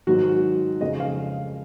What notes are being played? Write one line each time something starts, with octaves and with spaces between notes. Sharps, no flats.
G#2 D#3 F#3 F#4
F2 C#3 G#3 D#5
F5